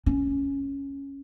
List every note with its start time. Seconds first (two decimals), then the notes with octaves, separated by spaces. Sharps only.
0.06 C#4